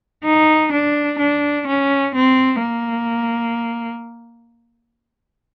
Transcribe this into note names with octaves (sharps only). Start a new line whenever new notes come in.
D#4
D4
D4
C#4
C4
A#3